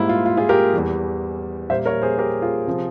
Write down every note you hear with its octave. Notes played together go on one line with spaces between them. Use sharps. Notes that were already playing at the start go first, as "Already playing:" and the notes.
Already playing: G#2 G3 A#3 E4
F4
F4
F4 G#4
G4 A#4
E2 E3 G3
A#2 G3 A#3 C5 E5
A#4 C#5
G#4 C5
G4 A#4
F4 G#4
C3 F3